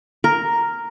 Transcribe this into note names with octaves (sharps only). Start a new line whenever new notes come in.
A#4